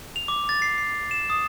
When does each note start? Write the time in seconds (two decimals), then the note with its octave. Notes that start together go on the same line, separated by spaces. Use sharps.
0.16 F7
0.28 D6
0.49 A6
0.62 C7
0.78 C7
1.11 E7
1.30 D#6